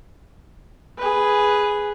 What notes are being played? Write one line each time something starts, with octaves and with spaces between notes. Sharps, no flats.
G#4 B4